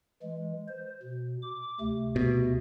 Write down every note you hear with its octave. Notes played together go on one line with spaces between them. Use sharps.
E3 G#3
C5
B2
D6
D2 C3 A3
B2